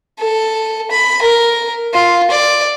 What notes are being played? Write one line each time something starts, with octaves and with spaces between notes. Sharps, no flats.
A4
B5
A#4
F4
D5